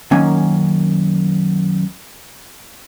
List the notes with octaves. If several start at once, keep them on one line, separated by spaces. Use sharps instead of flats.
F#2 D#3 A#3 C#4 G#5